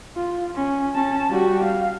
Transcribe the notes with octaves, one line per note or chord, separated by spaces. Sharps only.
F4
C#4
C#4 A5
G3 F#4
F5